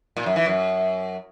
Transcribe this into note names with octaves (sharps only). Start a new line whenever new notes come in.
A#2
F#2
E3
F#2